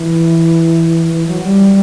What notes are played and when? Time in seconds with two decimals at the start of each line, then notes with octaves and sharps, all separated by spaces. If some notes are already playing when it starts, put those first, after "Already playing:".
Already playing: E3
1.14 E3
1.27 F#3
1.42 G3